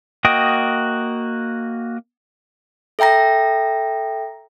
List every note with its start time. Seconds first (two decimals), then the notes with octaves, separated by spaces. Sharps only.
0.25 A#3 F#4 D#5 G5 D#6
2.99 A4 E5 G5 A#5 A#6